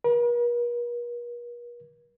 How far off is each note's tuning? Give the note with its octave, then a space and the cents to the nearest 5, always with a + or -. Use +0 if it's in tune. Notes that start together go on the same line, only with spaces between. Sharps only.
A#4 +45